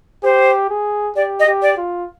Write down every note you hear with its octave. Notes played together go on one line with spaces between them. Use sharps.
G4 C5
G#4
G4 D5
D#5
G4
D5
F4